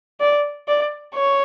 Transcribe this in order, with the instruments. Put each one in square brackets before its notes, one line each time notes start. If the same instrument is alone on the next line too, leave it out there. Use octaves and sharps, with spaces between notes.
[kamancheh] D5
D5
C#5